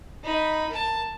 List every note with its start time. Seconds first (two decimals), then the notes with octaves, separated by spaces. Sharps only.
0.24 D#4 B5
0.70 A#4 A5